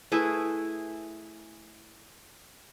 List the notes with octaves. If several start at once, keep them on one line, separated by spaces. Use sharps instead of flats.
A3 E4 G#4 B4